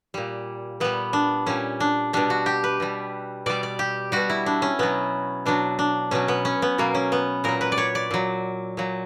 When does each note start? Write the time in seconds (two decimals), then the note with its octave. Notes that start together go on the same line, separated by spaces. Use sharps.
0.14 A#2 G3
0.80 A#2 G3 B3
1.13 D4
1.46 A#2 G3 C#4
1.80 D4
2.13 B2 G3 D4
2.30 F#4
2.46 G4
2.64 B4
2.80 B2 G3
3.46 B2 G3 D5
3.63 D5
3.79 G4
4.12 B2 G3 F#4
4.30 E4
4.46 D4
4.62 C#4
4.79 B2 F#3 B3
5.46 B2 F#3 D4
5.79 D4
6.11 B2 F#3 C#4
6.28 B3
6.45 C#4
6.62 B3
6.78 B2 F#3 A#3
6.95 C#4
7.12 B3
7.44 A#2 F#3 A#4
7.61 B4
7.72 D5
7.78 C#5
7.95 D5
8.11 A#2 F#3
8.77 A#2 F#3